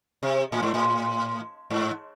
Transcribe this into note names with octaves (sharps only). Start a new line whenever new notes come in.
C3
A2
G#2
A2
G#2